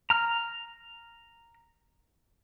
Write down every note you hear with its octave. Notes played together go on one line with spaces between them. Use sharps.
A#5 F6